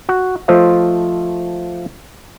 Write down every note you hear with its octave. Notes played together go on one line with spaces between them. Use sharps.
F#4
F3 A3 F4 C5 D#5 E5